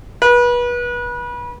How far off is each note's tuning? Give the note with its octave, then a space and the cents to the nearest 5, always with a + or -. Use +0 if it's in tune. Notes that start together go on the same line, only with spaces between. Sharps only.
B4 -30